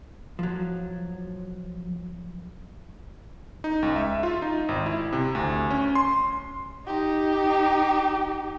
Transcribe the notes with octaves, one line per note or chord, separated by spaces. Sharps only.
F3 F#3
D#4
C#2
E5
F4
D#4
G#1
E4
C3
D2
C#4
C6
D#4 G4